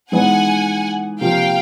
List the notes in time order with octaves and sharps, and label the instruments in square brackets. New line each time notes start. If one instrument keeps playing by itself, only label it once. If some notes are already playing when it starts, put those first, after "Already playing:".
[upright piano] E3 G#3 B3 D#4 [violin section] F#5 G#5
[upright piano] C3 F3 A#3 [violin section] F5 G5